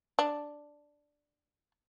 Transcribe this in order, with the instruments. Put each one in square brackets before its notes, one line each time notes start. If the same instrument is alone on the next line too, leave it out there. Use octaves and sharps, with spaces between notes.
[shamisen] D4